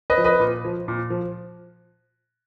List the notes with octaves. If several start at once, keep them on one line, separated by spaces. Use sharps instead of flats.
B4 D#5
F3
B4 D#5
A#2
F3
A#2
F3